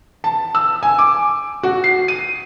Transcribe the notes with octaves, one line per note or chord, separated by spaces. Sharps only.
A5
E6
G#5
D6
F#4
C7
D#7